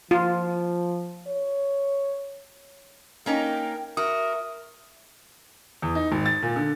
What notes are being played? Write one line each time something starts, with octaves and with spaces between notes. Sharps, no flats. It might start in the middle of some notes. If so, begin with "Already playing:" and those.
F3 F4
C#5
A#3 C#4 D#4 A#4 G5
F#4 A#4 E5 D#6
E2
D#4
G#1
A6
A#2
D3